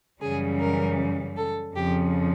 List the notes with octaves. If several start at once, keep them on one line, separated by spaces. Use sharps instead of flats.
F#2 C#3 E3 G3 G#4
A#4
A4
F2 C#3 F3 G4